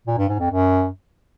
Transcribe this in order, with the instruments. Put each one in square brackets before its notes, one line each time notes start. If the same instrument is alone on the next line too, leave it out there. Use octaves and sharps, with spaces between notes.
[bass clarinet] A#2
G2
G#2
F2
F#2